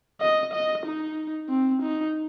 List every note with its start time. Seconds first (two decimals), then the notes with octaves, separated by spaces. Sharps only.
0.21 D#5
0.53 D#5
0.86 D#4
1.49 C4
1.82 D#4